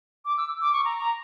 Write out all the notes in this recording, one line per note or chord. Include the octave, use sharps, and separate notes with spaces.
D6
E6
D6
C#6
A#5
A#5